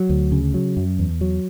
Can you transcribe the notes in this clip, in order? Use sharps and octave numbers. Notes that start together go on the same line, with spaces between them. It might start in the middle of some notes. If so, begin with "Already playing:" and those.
Already playing: F#3
D2
C#3
F#3
F#2
E2
F#3